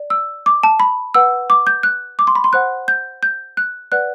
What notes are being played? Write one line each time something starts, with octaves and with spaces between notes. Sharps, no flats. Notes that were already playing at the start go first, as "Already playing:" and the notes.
Already playing: D5
E6
D6
A5
B5
B4 F#5 E6
D6
G6
F#6
D6
C6
B5
C6
C5 F#5 F#6
G6
G6
F#6
B4 D5 F#5 F#6